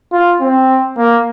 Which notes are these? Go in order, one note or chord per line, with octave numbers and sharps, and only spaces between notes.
F4
C4
A#3